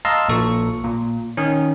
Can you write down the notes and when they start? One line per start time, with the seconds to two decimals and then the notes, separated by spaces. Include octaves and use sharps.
0.05 D#5 F5 A5 A#5 C6 E6
0.29 A#1 A#2 A4 C#6
0.84 A#2
1.37 D#3 C#4